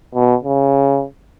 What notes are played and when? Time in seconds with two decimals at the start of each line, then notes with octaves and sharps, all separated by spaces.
0.15 B2
0.44 C#3